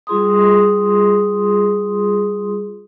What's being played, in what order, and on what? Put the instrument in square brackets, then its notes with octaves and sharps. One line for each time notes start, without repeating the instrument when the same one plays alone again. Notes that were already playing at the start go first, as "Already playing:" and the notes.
[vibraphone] G3 F4 G#4 C6 D#6